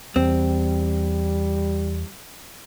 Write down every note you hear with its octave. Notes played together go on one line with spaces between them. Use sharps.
E2 G3 C4